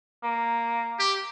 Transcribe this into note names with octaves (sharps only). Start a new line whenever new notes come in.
A#3
G4